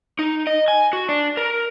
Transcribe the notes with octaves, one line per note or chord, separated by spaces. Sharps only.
D#4
D#5
G#5
F#4
D4
A#4